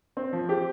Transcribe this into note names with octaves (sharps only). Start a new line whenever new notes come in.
C4
F3
G4